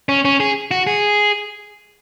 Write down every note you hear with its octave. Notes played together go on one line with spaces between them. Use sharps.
C#4
C#4
G#4
F#4
G#4